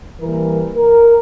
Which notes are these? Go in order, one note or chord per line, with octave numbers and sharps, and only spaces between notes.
E3 G3 A#3 A#4
A#4